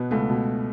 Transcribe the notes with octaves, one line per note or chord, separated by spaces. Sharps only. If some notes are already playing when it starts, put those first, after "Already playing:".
Already playing: B2 B3
C#2 A3
B2